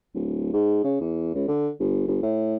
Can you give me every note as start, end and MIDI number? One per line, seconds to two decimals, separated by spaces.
0.14 0.48 26
0.53 0.79 44
0.84 0.99 49
1.01 1.34 40
1.35 1.47 37
1.48 1.69 50
1.80 2.05 31
2.08 2.18 31
2.23 2.56 45